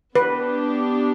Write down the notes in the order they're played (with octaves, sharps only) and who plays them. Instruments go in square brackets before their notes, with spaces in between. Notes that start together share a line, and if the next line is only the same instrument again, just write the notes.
[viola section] B3 D4 G4 [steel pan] B4